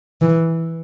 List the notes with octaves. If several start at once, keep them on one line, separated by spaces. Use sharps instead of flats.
E3